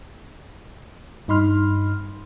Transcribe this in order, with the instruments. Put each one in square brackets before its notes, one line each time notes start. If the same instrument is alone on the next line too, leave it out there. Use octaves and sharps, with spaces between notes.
[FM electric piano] G2 D#4 B5 C6 F6